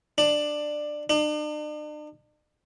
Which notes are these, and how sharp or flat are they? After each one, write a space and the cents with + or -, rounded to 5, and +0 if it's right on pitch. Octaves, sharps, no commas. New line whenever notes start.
D4 +15
D4 +45